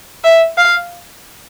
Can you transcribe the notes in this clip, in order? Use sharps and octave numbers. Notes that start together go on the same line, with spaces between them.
E5
F5